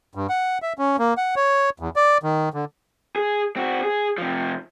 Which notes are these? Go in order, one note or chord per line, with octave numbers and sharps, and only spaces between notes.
G2
F#5
E5
C#4
A#3
F#5
C#5
E2
D5
D#3
D3
G#4
C4 F#4
G#4
C3 F3